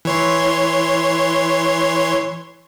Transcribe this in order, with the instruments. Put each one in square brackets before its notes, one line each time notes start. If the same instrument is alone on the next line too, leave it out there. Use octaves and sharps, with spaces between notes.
[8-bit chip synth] E3 C#5 C6